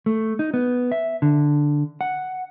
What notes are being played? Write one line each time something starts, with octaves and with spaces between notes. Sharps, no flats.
A3
D#4
B3
E5
D3
F#5